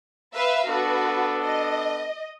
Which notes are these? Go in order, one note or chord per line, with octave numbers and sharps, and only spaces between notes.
B4 E5 F5
B3 D4 F#4 A4 B4
D#5